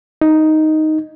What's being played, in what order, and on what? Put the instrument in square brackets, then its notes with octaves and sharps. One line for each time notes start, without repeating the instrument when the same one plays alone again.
[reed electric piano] D#4